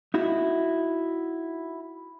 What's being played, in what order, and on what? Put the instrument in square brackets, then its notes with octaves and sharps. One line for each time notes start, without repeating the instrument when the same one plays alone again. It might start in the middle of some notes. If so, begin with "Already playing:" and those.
[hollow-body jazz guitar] D#4 E4 F#4